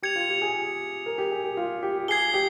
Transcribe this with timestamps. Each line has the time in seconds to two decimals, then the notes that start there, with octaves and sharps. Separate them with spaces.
0.02 G4 G#6 C#7 F7
0.16 F4
0.29 G4
0.42 G#4
1.06 A#4
1.18 G4
1.31 G#4
1.44 G4
1.57 F4
1.83 G4
2.08 G#4 G#6 C7 G7
2.34 G4